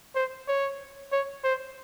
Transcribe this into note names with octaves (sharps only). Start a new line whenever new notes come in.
C5
C#5
C#5
C5